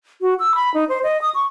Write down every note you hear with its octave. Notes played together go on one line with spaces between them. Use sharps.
F#4
E6
B5
D#4
C5
D#5
D#6
C#6